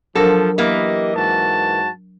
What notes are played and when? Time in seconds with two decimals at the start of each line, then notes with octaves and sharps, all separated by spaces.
0.15 F3 F#3 D4 A4 A#4
0.58 E3 A#3 G4 D#5
1.15 G#2 F#4 A5